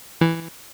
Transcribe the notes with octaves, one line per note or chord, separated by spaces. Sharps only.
E3